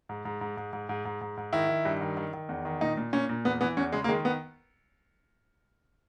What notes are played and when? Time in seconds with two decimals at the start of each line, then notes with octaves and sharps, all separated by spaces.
0.09 G#2
0.25 G#2
0.41 G#2
0.57 G#2
0.73 G#2
0.89 G#2
1.05 G#2
1.21 G#2
1.37 G#2
1.53 D#3 E4
1.69 D#3
1.85 G2
2.01 D#3
2.17 D#3
2.34 D#3
2.49 E2
2.65 D#3
2.81 A#2 D#4
2.97 A#2
3.13 A#2 C#4
3.29 A#2
3.45 E2 B3
3.61 E3 B3
3.77 E2 C#4
3.92 C#3 G#3
4.04 A#3
4.09 D#3 G#3
4.25 B3